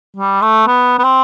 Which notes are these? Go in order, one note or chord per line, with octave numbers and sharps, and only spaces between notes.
G3
A3
B3
B3
C4